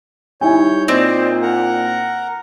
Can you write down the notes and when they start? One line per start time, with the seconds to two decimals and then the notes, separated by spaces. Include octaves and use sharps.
0.41 G3 D#4 E4 C#5 G#5 G6
0.88 A#2 C4 C5 D5 D#5
1.42 A#4 F#5 A#5